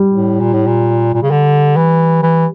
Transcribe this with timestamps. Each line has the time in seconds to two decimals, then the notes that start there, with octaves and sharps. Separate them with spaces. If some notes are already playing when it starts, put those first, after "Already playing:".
Already playing: G3
0.10 A2
0.40 A#2
0.53 A2
0.67 A#2
1.14 A#2
1.23 C#3
1.31 D3
1.76 E3
2.22 E3